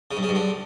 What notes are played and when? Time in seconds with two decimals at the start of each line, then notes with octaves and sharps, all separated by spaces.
0.11 C#3
0.17 G2
0.23 C#3
0.29 G2
0.35 D3